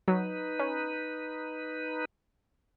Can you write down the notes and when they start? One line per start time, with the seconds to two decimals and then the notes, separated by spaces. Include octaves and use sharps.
0.08 F#3 D#4 B4
0.59 C#4